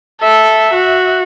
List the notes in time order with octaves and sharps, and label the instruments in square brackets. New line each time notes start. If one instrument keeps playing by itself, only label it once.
[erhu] A4 [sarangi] E5
[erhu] F#4